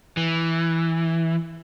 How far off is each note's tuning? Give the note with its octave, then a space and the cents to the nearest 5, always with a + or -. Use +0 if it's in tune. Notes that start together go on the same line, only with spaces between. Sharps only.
E3 +0